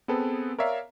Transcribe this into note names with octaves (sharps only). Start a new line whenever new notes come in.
B3 C4 G#4 A4 B4
A#4 C#5 D5 E5 F5